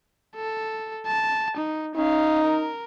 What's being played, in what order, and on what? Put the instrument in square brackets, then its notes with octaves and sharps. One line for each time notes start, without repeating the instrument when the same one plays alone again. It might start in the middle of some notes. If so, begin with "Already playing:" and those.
[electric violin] A4
A5
D#4
[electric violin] C#4 F5 [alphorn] D#4
[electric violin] A#4